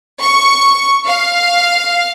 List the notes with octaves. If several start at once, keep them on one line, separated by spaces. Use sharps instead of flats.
C#6
F5